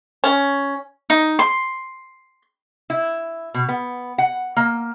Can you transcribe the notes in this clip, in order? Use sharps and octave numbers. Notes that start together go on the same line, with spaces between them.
C#4
D#4
C6
E4
B2
B3
F#5
A#3